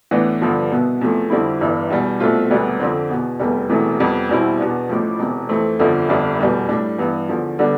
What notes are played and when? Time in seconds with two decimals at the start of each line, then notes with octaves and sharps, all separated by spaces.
0.11 A2 E3 B3 D4
0.41 G2 D3 F3 B3
0.71 C2 B2 B3
1.01 E2 C3 F3 A3
1.30 F2 D3 G3 C4 E4
1.61 G1 G2 E3
1.90 E2 B2 G3
2.20 C2 B2 A3 C4 F4
2.50 E1 D2 C3 G3 B3
2.80 F2 D3 F3 C4
3.10 E2 B2 B3
3.39 F1 E2 C3 G3
3.69 E1 E2 C3 E3 A3
3.99 F2 C3 G3 B3
4.29 E2 B2 G3 C4 E4
4.59 E2 B2 B3 D4
4.89 A1 A2 F3
5.19 E1 E2 C3
5.49 F2 E3 A3 C4
5.79 G1 F2 D3 F3
6.09 G1 F2 D3 G3
6.39 F1 E2 B2 G3
6.69 A2 G3 D4
6.98 G2 E3 B3
7.29 E2 D3 F3
7.59 D3 G3 B3 D4